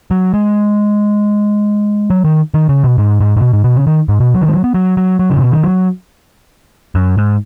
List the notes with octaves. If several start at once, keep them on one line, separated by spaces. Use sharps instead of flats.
F#3
G#3
F#3
D#3
D#3
C#3
B2
G#2
G#2
G#2
B2
G#2
B2
C#3
D#3
G#2
B2
F#3
D#3
G#3
F#3
B3
F#3
F#3
F#3
C#3
G#2
B2
D#3
F#3
F#2
G#2